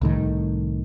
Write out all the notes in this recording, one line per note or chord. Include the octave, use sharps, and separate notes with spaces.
C2 A2 D#3